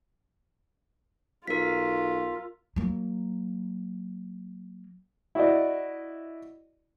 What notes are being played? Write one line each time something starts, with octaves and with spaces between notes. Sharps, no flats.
B1 F4 A#4 B6
F#3 A#3
E4 F#4 D5 D#5